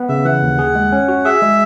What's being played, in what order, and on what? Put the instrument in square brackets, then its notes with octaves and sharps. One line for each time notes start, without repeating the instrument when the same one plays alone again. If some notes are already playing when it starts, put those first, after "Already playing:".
Already playing: [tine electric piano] B3 B4
[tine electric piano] C#3 [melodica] E5
[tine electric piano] E3 [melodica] F#5
[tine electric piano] D#2
G#4
G#3
C#4
F#4
[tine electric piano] G#4 [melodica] E5
[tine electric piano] G#3